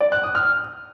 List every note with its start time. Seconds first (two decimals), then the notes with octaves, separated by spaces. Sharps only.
0.01 D5
0.12 F#6
0.23 D#6
0.35 F6